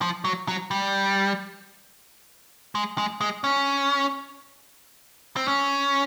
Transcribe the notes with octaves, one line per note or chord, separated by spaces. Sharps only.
F3
F#3
F#3
G3
G#3
G#3
G#3
C#4
C4
C#4